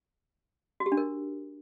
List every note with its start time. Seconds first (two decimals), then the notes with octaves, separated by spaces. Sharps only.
0.80 F#4
0.86 G4
0.92 D4
0.97 A#4